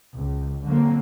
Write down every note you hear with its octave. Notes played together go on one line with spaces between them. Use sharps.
C#2
D3 F#3 A#3 C4